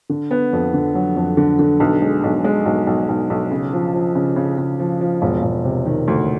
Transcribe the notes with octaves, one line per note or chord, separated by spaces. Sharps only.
D3
B3
F2
D3
F#3
F2
D3
D3
B1
G#3
B1
G#3
B1
B1
B1
B1
C#3
F3
F3
C#3
C#3
C#3
F3
F3
E1
E1
C3
D#3
D2